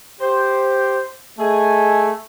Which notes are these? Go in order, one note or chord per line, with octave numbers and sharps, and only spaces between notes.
G4 C5
A3 G#4 D#5 G#5